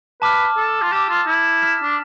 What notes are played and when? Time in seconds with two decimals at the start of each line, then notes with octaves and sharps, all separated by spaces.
0.22 B4 A5 D6 F6
0.57 A4
0.82 F4
0.92 G4 A5 E6 A6 E7
1.09 F4
1.27 E4
1.62 F6 B6 E7
1.83 D4